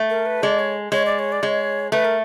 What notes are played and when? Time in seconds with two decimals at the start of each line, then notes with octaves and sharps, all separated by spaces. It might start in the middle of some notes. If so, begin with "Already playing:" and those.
Already playing: A3
0.10 A#4
0.26 B4
0.43 G#3 D5
0.59 C#5
0.92 G#3 C#5
1.06 D5
1.19 C#5
1.32 D5
1.43 G#3 C#5
1.92 A3 B4
2.04 A#4